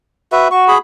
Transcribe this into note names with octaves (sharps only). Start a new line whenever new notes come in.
F#4 B4 E5
F#4 C#6
G#4 B5